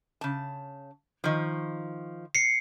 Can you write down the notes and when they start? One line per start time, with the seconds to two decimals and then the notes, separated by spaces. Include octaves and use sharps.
0.21 C#3 A5
1.24 D#3 F3
2.35 C7 C#7